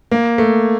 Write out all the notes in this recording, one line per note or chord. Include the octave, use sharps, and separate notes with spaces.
A#3
A3